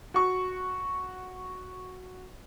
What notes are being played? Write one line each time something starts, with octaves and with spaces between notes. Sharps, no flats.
F#4 C#6